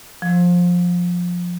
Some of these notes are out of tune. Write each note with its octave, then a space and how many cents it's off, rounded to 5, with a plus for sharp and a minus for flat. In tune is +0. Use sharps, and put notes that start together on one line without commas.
F3 +15